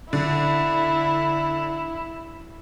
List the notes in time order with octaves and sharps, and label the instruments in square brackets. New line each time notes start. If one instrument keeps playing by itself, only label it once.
[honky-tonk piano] D3 [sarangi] E4